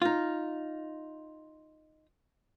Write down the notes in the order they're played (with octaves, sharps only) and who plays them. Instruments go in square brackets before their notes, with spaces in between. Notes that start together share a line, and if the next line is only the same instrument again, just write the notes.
[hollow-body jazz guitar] D#4 F4